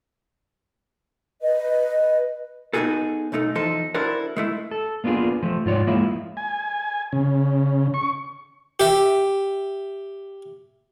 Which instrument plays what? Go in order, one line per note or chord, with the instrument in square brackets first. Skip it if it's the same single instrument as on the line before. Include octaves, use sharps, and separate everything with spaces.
[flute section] B4 D#5
[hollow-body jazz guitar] B3 D#4 F4 F#4 G#4 A4
B1 F#2 A3 D#4 A4
E2 F3 D#4 A4 C6
D4 E4 F#4 A4 A#4 C5
G#3 A3 E4
[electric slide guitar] A4
A#3 B3 D4 F4 G#4
F3 A3
G#2 F4 C#5 D5
F3 G#3 A#3 E4
[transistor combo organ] G#5
C#3
C#6
[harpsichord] G4 E5